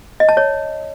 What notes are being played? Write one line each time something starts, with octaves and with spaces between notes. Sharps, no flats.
D#5
A5
C#5